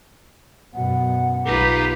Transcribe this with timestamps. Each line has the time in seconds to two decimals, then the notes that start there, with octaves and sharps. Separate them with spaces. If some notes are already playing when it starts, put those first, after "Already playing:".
0.74 F#2 B2 F#5
1.45 B1 D#4 F4 G4 B4